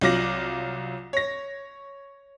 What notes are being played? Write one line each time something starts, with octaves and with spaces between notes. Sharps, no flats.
C2 F#3 F4 D6 A#6 F#7
C#5 A#6